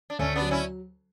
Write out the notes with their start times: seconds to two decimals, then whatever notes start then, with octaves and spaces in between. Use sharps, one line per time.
0.10 D4
0.19 D2 A3 C#4
0.36 B3 D4
0.41 F#3
0.51 C#4 E4